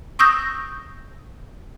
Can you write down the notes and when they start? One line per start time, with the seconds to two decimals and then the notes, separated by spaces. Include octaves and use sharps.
0.19 C#6 D#6 E6 G6 A#6